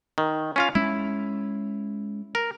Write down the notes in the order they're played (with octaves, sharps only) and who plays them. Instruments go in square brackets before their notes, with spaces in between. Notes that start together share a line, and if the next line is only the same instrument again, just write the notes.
[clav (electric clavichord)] D#3
C#4 F4 F5
[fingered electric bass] G#3 C#4 [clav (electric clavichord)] E4
[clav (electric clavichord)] A#4